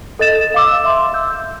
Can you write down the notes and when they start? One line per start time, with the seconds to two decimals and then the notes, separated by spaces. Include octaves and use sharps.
0.19 A4 D#5 A6 E7
0.54 F5 D6 E6
0.84 E5 C6
1.14 E6 G6